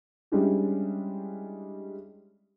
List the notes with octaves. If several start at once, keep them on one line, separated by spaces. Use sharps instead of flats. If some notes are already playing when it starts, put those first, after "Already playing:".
G3 G#3 C#4 D4 E4 G4